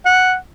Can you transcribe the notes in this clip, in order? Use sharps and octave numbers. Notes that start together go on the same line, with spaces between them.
F#5